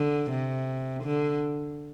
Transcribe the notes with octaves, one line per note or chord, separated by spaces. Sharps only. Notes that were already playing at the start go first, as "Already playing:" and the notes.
Already playing: D3
C3
D3